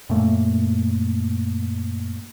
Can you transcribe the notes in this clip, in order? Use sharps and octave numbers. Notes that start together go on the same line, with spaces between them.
F#2 A#2 A3 A#3